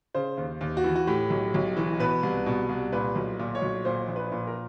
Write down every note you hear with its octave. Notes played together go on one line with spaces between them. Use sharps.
C#3 C5
D#2
D#2
F#4
E3
F#4
A2 G4
B1
B1
E3
B2 B4
C2
B2
C2
A#2 B4
B1
A#2
C#5
B1
A#2 C5
A#1
B4
A#2
A#4